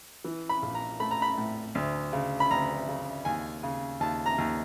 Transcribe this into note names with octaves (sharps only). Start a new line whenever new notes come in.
E3
B5
A#1
A#5
A3 B5
A#5
B5
A2
D2
C#3
B5
D2 A#5
C#3
D#2 G#5
C#3
D#2 A5
A#5
D#2